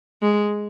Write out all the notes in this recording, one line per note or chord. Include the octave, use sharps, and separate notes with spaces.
G#3